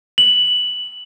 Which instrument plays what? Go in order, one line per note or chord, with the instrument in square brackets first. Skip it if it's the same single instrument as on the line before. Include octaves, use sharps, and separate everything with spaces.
[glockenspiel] F#7